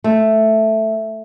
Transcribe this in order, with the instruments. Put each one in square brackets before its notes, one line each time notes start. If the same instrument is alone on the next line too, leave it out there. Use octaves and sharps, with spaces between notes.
[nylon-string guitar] A3